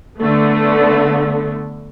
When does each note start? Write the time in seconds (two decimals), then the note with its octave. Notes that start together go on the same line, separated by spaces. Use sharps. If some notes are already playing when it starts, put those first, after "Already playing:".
0.17 D3 A3 B3